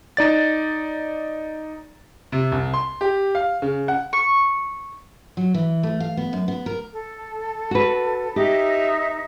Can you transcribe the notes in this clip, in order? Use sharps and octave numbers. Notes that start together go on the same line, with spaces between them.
D#4 D5 A6
C3
C2
C6
G4
F5
C#3
F#5
C#6
F#3
E3
A3
F5
B3
F#2
B3
A#4
A4
F#4 B4
D#4 G4 E5